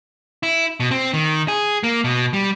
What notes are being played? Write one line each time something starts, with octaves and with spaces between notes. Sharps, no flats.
E4
B2
C4
D#3
G#4
A#3
B2
G3